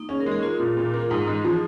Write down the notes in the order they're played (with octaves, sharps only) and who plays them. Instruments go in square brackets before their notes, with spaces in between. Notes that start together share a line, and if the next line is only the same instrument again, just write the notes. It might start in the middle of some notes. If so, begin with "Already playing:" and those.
Already playing: [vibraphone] A#3 D#4
[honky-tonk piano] C#4 [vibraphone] G#4
[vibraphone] A#4
[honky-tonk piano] G#3
[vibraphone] G#4
[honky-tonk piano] A#3 [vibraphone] F4
[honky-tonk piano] A#2
A#2
A#3
[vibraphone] F4
[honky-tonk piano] G#2 [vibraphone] D#4
[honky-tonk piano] G#3
[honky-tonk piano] F3 [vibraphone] G#4